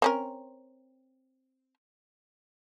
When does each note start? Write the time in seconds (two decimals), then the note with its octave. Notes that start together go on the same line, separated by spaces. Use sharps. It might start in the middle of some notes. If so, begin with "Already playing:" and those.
0.02 C4 C#4 A#4